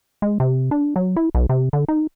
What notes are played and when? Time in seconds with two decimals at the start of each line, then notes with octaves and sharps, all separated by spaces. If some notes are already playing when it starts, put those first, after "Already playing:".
0.22 G#3
0.40 C3
0.71 D4
0.96 F#3
1.16 E4
1.35 B1
1.49 C3
1.73 D3
1.88 D#4